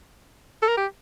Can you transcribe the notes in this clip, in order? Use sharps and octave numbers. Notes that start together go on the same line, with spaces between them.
A4
A#4
G4